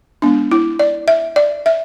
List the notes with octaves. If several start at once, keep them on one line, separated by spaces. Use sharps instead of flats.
G#3 B3 D4
E4
D5
E5
D5
E5